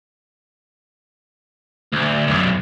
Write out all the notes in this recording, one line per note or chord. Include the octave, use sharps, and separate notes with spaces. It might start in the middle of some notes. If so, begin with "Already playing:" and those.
D2
B1 F#2